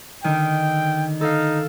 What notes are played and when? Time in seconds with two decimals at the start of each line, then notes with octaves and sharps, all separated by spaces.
0.24 D3 D#3 G5
1.21 D#4 A4 F5